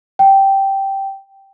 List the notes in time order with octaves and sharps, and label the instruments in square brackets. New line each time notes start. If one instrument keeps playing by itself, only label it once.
[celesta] G5